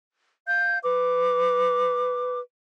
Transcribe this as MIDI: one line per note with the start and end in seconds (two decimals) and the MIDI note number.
0.47 0.78 77
0.47 0.78 91
0.83 2.39 71
0.83 2.39 86